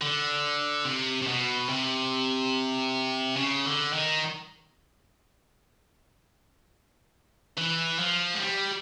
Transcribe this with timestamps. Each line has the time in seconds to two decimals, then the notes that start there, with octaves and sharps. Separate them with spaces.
0.01 D3
0.85 C3
1.22 C3
1.27 B2
1.69 C3
3.37 C#3
3.65 D3
3.93 D#3
7.57 E3
7.99 F3
8.34 G#3
8.40 G3